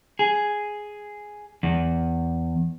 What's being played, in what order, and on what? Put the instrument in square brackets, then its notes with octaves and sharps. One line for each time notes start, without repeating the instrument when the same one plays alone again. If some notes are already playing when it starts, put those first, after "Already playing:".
[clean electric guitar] G#4
E2